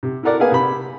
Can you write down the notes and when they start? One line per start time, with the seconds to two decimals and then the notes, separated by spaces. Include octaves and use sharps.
0.03 C3
0.23 E4 F#4 A4 A#4 D5 F#5
0.40 A#3 B3 G#4 B4 F5 G#5
0.52 C3 B5